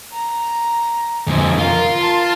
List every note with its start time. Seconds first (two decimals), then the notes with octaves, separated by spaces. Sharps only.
0.13 A#5
1.28 F2 D3 G#3
1.59 F4 A#4
2.01 A5 C6